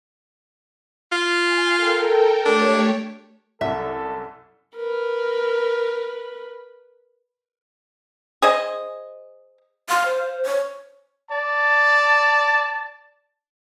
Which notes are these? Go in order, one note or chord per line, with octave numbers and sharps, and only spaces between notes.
F4
G#5
A4 A#4 G5
A3 D4 G4 C#5
C2 F#2 A4 E5
A#4 B4
G#4 C5 D#5
F5 C6
C5
C#5
D5 A5